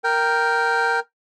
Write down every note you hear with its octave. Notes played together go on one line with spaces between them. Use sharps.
A#4 G5